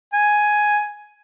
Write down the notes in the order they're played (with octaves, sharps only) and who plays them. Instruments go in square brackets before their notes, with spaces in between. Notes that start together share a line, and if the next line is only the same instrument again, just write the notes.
[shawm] G#5